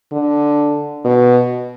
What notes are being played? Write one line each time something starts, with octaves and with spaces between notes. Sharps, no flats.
D3
B2